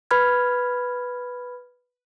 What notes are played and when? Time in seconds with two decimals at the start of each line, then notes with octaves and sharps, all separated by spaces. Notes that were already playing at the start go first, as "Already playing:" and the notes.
0.11 B4 B5 F6 G#6